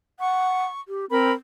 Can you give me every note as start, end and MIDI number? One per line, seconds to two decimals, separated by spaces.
0.20 0.65 78
0.20 0.80 85
0.88 1.05 67
1.10 1.30 60
1.10 1.32 70
1.10 1.32 83